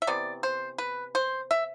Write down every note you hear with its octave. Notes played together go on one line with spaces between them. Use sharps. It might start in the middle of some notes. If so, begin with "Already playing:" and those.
E5
C3 E3 B3 D5
C5
B4
C5
E5